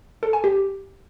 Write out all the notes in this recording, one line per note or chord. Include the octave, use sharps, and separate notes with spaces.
A4
G#5
G4